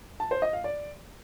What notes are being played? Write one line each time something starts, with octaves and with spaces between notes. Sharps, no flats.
A5
C5
D#5
F5
D5